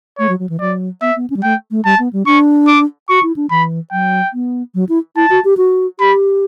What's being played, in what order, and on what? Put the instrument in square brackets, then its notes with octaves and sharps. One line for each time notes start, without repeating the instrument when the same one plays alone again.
[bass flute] A3 [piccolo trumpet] C#5
[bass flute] F#3
F#3
E3
[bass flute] F#3 [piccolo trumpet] D5
[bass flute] B3 [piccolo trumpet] E5
[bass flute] B3
C#4
G3
[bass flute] A3 [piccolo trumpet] G5
[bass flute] A3
[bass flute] G3 [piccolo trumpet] A5
[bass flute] B3
G3
[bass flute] D4 [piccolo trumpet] C#6
[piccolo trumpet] D6
[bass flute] F#4 [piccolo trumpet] C#6
[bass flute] E4
D4
[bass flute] E3 [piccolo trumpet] B5
[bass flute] F#3 [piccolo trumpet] G5
[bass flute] B3
F#3
E4
[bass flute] E4 [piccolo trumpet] A5
[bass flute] F#4
G4
F#4
[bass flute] G4 [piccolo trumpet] B5